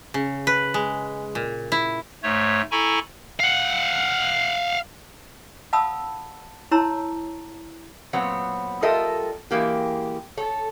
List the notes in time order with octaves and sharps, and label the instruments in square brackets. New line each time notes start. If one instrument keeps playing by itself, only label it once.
[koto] C#3
B4
G#3
A#2
E4
[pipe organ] G#2 A3 C#5
E4 A4 G#5 A#5 B5 C#6
[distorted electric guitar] F5 F#5
[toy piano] F5 F#5 A5 B5 D#6 E6
E4 C#5 A5 A#5 C6 E6
[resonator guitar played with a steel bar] A#2 F#3 B3 C4 C#5
G3 F4 A4 A#4 D#5 E5
E3 G#3 A#3 G4
A4 C#5